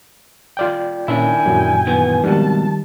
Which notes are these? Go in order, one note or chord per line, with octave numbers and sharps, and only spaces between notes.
F4 D5 G5
A#2 D#3 C#4 D4 E4 G5 G#5
F#2 A#2 F#3
D#3 E3 B3
F2 G#2 B2 D#3 G3 A5